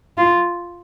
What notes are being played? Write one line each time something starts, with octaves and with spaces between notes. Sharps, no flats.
F4